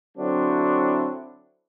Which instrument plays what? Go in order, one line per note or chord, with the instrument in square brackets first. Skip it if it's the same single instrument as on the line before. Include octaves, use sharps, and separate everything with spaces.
[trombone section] D3 F#3 C4 D4 E4 F#4